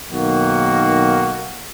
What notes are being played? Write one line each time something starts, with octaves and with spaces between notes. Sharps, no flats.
B1 D#3 A#3 F#4